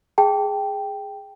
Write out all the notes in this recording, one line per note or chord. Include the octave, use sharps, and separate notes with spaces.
G#4 G5 A5